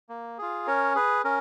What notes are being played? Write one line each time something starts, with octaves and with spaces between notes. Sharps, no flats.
A#3
F4 G#4
C#4 A#4 C#5
G#4 B4
C#4 A#4